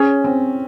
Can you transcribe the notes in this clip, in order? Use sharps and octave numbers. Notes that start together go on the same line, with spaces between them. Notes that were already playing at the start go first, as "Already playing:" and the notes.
Already playing: C#4 G#4 C#5 G#5
C4